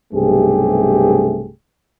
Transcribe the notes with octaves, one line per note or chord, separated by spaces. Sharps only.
B1 G2 C3 A3 G4 G#4